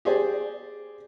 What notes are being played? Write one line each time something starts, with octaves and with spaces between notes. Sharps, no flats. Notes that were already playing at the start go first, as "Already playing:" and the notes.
G4 G#4 C5 D5